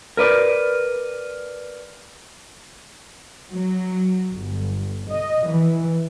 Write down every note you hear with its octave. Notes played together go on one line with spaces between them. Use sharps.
A#4 B4 D5
F#3
G1
D#5
E3